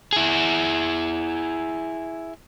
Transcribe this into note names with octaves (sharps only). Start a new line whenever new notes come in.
E4 G#4